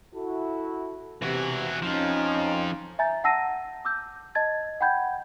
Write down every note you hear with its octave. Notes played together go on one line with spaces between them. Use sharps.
E4 F#4 A4
C3 E3 F#4
F2 F3 C#4 D#4
E5 G#5 A#5 G6 A6
F#5 A5 E6 A#6 C7 D#7
D6 E6 G6
D#5 A5 G#6 A6
F#5 G5 B5 G6 G#6